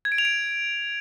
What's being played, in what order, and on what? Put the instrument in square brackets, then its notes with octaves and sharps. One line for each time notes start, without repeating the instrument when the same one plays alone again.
[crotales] G#6
D7
F7
D7